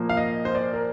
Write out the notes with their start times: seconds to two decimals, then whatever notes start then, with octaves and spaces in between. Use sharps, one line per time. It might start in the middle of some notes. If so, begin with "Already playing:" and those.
Already playing: A#2 F3 A#3
0.09 F5
0.17 D#5
0.45 C5
0.55 D5
0.73 A#4